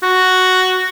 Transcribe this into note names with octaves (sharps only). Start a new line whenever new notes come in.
F#4